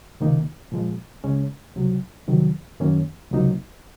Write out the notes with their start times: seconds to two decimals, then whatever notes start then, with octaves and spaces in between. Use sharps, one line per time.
0.20 C#2 C3 D#3 A#3 D#4
0.72 A#2 F3 G#3
1.24 C#2 C#3 G#3 C#4
1.76 C#2 C3 F#3
2.28 F2 C3 D#3 F#3
2.80 F#2 D#3 A#3 C#4
3.32 C#2 C3 F#3 A#3 D#4